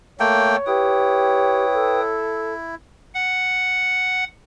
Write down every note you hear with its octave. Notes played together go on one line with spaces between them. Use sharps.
A3 A#3 C#5 G5
E4 G4 B4 G5 D#6
A4
F#5